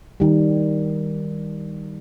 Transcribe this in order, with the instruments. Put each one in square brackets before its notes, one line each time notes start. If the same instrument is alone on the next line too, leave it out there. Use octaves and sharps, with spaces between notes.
[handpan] D#3 G3